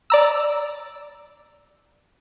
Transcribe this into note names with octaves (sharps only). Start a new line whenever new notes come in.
D5 A#5 E6